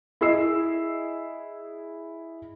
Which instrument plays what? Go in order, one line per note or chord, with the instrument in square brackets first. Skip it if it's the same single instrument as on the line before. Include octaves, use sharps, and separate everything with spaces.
[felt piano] E4 G#4 D#5 E6 C7